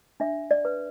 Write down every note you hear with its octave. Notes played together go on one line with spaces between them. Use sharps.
D4 E5
D5
B4